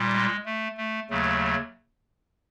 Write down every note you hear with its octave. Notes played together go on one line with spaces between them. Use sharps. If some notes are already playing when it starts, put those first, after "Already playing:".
Already playing: A#2 G3
G#3
A3
A3
D#2 C#3 F#3 A3